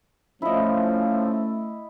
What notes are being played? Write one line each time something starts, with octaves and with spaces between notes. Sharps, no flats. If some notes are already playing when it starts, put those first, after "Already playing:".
F3 A3 C#4 E4 D#5